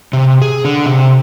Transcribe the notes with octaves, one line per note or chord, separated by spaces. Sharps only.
C3
G#4
D3
C3